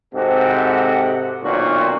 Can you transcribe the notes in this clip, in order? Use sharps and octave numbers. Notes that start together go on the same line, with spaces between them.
G#2 C3 C4 F#4 G4 A4
B1 A#2 D#3 C4 D4 F#4